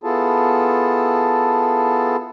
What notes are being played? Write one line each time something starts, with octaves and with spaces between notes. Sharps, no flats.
B3 E4 F4 G#4 A4 A5